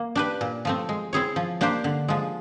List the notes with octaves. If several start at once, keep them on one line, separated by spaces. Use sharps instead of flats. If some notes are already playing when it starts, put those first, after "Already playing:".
Already playing: A#3
D4 G4 B4
A#2
F3 A3 C4
G#3
C4 E4 G#4 C#5
F3
A#3 D4 G4 C5
D3
F3 G#3